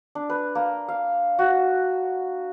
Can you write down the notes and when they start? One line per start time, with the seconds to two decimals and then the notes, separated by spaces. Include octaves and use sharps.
0.15 D4
0.30 B4
0.55 A#3
0.88 F5
1.39 F#4